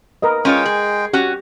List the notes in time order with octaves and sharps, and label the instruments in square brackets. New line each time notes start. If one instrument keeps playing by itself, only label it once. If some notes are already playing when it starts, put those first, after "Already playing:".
[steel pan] A#4 B4 D#5
[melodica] G#3 G5 [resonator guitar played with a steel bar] C#4 F4 C#5
[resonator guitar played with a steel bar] G#4
[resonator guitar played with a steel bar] C#4 F#4 [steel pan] G4